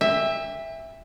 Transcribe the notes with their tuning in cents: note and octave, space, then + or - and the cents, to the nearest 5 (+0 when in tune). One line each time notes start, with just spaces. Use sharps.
E5 +0 G5 +40